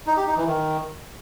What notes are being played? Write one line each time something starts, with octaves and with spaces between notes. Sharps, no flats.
D#4
G4
D#4
E3
D#3